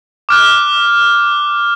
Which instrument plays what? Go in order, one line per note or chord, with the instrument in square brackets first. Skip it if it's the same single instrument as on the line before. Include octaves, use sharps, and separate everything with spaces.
[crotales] D6 F6 F#6